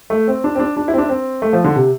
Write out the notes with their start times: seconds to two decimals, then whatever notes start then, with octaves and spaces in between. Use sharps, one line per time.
0.10 A3
0.28 C4
0.44 D4
0.55 C4
0.59 D4
0.77 D4
0.88 E4
0.93 C4
0.98 D4
1.09 C4
1.42 A3
1.53 F3
1.64 D3
1.76 C3